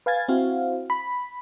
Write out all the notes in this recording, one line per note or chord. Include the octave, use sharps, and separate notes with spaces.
B4 F5 G#5 G#6 A6
C4 E4 F#4 F5
B5